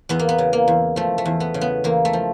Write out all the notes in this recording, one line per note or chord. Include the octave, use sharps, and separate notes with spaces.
E2 B3
A#3
B3
C#3
A#3
E2
F3 A3
A3
E2
B3
C#3
B3
E2 A#3
A3
F3